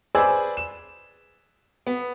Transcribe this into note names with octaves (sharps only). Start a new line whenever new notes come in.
G#4 B4 C5 D5 G#5 E6
E7
B3